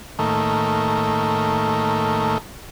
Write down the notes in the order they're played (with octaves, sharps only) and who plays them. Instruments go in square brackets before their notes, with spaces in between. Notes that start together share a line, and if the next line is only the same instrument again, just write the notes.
[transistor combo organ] A2 D#3 A3 A#3